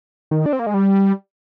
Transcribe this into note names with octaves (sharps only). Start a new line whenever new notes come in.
D#3
D4
C4
A#3
G#3
G3